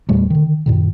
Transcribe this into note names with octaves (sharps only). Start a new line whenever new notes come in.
E2 A#2 G3 A3
D3 D#3
F#2 A#2 D#3